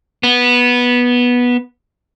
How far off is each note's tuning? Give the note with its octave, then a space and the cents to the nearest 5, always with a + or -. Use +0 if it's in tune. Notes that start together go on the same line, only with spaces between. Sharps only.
B3 -10